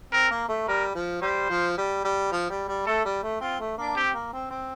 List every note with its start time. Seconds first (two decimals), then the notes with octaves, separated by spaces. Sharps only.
0.13 C4 A#4
0.31 A#3
0.49 A3
0.68 G3 A#4
0.95 F3
1.22 G3 C5
1.49 F3
1.78 G3
2.05 G3
2.32 F3
2.50 G3
2.69 G3
2.86 A3 A4
3.05 G3
3.23 A3
3.41 C4 F4
3.60 A3
3.78 A#3 D4
3.96 C4 G4
4.14 A#3
4.33 C4
4.51 C4